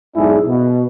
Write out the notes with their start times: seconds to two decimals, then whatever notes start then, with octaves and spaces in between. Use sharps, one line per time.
0.16 B1 G#2 D4 E4 G#4
0.47 B2